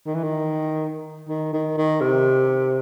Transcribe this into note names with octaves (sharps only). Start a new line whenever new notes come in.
D#3
E3
D#3
D#3
D#3
D#3
C3